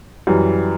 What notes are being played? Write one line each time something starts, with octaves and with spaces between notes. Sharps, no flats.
F#2 E3 G3